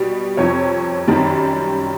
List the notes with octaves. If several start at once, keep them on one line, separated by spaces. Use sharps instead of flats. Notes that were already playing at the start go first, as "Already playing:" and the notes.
Already playing: B2 G3
F2 C3 F3 C#5
F#2 D#3 G3